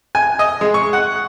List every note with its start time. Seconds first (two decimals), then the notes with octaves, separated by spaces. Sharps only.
0.15 G#5
0.39 D#5
0.61 G#3
0.74 C#6
0.93 F#5